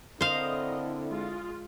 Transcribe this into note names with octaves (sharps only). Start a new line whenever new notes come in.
D3 C4 E4 A#4 C5 D#5 F5
G#3 F4